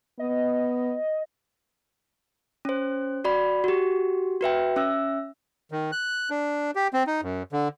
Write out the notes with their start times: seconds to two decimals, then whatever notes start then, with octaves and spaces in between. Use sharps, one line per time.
0.19 B3 D#5
2.65 C#4 C5
3.24 F#4 D5 B5
3.64 F#4 G4
4.41 F#4 B4 E5 G5
4.76 C#4 E5 E6
5.71 D#3
5.92 F#6
6.30 D4
6.75 G4
6.93 C4
7.07 D#4
7.23 F#2
7.52 D3